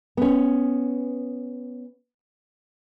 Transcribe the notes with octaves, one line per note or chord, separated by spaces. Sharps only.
B3 C#4